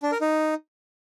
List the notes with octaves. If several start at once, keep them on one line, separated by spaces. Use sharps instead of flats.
D4
A#4
D#4